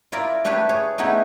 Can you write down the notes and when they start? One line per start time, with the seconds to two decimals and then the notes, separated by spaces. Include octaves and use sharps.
0.12 E4 F4 A#4 D5
0.44 A3 D4 G4 A4 B4 C#5
0.69 G#4 C#5
0.98 A3 B3 D#4 E4 G4 G#4